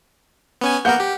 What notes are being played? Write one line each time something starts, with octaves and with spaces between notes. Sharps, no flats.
B3 C#4 G#5
A#3 B3 A#4 F#5 G6
G4